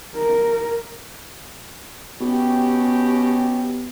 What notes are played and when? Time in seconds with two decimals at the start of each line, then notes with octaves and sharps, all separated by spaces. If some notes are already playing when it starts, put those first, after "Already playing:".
0.16 A#4
2.21 B2 C#4 G4